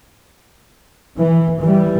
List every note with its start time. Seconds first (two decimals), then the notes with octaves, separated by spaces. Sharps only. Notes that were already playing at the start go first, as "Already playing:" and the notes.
1.17 E3
1.60 E3 G3